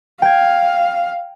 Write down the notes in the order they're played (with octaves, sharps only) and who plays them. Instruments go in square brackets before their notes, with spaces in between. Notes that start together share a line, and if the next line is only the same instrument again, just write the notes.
[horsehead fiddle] F5 [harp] G5 G#6